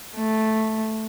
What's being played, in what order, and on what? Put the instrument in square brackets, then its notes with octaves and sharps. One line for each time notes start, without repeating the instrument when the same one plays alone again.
[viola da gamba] A3